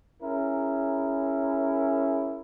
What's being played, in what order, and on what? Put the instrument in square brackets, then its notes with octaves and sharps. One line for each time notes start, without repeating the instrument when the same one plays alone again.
[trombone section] C#4 E4 G#4 A#4